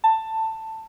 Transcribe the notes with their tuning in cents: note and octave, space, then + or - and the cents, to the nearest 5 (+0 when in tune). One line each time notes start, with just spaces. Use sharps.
A5 +15